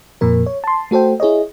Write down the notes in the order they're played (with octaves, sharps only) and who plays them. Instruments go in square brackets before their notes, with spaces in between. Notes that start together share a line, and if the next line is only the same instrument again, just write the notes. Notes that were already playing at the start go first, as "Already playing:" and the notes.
[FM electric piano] F2 A#2 F3 A#4
C#5
A5 C6
A3 F#4 A4 C5 G5
E4 G#4 C#5 D#5